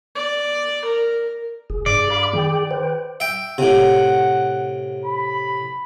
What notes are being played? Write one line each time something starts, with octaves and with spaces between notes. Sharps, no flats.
D5
A#4
E1 G#4
G2 D5
F5 B5 D6
D#3 G#4 G5
B4 C5 G5
E5 G5
A2 C3 F#5
B5